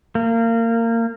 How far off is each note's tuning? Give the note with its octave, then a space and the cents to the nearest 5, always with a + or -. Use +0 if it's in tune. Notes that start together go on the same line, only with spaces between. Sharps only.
A#3 -25